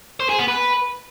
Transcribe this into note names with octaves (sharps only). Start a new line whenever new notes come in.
C5
G#4
B3
B4